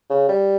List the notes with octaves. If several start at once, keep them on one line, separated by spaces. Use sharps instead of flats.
C#3
G3